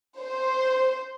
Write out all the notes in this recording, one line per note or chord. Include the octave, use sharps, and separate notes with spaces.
C5